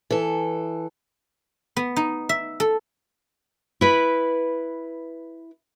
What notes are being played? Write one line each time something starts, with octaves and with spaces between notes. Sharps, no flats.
E3 A4
B3
D#4
E5
A4
E4 B4